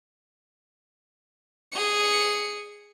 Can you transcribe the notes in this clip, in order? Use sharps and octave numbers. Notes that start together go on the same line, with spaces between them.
G#4 C#7